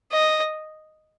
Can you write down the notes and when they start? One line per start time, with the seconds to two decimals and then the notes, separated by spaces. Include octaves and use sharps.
0.12 D#5